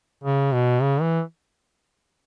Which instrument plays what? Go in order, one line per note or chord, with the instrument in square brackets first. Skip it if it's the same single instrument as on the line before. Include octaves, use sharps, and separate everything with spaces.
[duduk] C#3
B2
C#3
E3